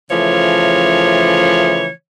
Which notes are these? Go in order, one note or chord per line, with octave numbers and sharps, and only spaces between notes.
C#3 E3 F3 A3 C#5